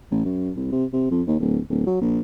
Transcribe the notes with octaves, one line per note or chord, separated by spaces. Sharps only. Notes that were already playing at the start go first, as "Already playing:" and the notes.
A1
F#2
C2
C3
C3
F2
D#2
D1
D1
F#3
A#1